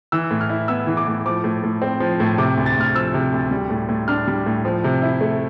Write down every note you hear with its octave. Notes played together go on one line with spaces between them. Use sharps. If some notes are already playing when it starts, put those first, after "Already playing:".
E3 E6
A2
F6
E4
B3 E6
E3
D6
A2
F3 D6
A2
A2
C4
F3
A2
C3 D6
D2
A6
D2 F6
F3 E6
C3
D2
G3
A2
A2
D4 F6
G3
A2
F3
C3
E4
A3